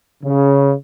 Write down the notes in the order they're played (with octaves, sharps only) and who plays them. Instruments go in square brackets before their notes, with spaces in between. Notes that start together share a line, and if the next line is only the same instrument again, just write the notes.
[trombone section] C#3